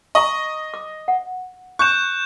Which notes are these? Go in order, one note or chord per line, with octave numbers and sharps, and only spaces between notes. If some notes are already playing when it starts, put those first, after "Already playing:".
D#5 A#5 C#6
D6
F#5
C#6 F#6 G6 E7